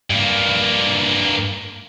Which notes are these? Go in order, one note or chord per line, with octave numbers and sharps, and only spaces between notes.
G2 A#3